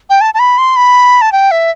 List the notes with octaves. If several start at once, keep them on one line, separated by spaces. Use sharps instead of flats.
G5
A5
A5
B5
C6
B5
A5
G5
E5